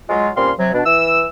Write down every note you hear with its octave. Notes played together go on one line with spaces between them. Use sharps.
F#3 G#3 F4
A#2 G3 C4 C#4 F5 C6
C3 F#3
B2 D4
E3 E6